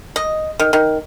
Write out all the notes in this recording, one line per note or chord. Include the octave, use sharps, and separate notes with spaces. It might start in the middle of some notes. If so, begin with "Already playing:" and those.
D#5
D#3
D#3